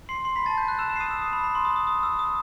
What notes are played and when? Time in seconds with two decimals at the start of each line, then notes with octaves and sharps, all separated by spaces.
0.09 C6 C7
0.24 C6 C7
0.36 B5 B6
0.46 A5 A6
0.58 G6
0.68 F#6
0.79 E6 E7
0.89 E6 E7
0.96 C7
1.00 D#6 D#7
1.11 E6
1.22 D#6
1.33 B5
1.44 B5
1.55 C6
1.65 D#6
1.76 D#6
1.87 D#6
2.03 E6
2.19 D#6